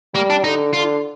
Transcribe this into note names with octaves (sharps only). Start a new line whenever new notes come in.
G3 A#3
D4
D3 D#4
D3 F4